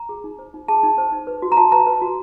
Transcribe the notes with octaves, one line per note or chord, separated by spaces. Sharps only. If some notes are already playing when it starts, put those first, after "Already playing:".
Already playing: A#5
G#4
D#4
C5
D#4
G#4 A5
D#4
C5
D#4
B4
F#4
A#5
F#4 A5
B4 A#5
B4
F#4